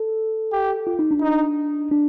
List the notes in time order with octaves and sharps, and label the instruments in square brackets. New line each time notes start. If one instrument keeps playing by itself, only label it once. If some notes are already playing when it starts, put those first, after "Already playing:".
Already playing: [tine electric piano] A4
[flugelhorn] G4
[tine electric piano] F4
D#4
D4
[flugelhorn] D#4
[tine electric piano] D4